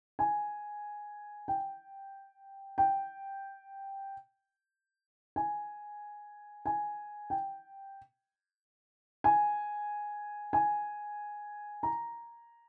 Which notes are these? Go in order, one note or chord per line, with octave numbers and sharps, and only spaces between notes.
G#5
G5
G5
G#5
G#5
G5
G#5
G#5
A#5